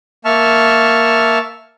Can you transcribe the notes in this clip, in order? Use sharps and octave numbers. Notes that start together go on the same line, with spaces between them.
A#3 E5 A5 C#6 F6